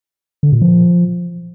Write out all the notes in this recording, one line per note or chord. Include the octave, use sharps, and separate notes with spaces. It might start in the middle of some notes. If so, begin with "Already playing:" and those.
D3
A#2
F3